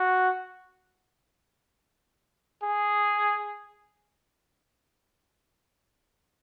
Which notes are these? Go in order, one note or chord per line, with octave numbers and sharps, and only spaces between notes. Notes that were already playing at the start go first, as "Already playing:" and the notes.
Already playing: F#4
G#4